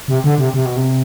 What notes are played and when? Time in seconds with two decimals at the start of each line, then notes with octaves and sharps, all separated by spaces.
0.08 C3
0.24 D3
0.38 C3
0.54 C3
0.65 B2
0.76 C3